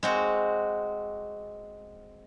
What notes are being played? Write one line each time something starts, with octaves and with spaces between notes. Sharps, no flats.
G#3 C4 F#4